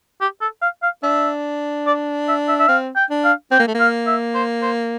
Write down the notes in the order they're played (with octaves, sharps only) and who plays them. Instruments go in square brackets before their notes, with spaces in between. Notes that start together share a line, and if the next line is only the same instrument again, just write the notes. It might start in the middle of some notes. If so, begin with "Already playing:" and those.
[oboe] G4
A4
F5
F5
[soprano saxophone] D4 [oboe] E5
[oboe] D5
E5
E5
E5
[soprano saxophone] C4 [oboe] F5
[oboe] G5
[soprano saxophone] D4
[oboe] F5
[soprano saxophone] C4 [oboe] G5
[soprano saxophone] A#3
A3
[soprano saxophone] A#3 [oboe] F5
[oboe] E5
C5
C5